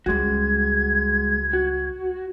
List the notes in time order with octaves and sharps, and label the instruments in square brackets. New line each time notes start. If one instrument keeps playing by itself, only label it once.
[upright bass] C#2 G3 [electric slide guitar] G#3 F#4 [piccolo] G#6
[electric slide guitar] F#4